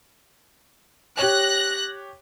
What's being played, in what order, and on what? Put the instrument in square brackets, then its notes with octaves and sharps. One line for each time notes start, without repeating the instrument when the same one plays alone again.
[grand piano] G4 C#5 [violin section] F#6 A#6